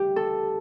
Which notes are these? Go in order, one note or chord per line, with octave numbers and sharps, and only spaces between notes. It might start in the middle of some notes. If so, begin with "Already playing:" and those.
Already playing: D2 C#3 E3 G3 G4
A4